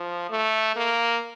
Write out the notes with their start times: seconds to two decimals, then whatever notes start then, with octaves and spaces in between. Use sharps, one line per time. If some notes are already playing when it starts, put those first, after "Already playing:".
Already playing: F3
0.30 A3
0.76 A#3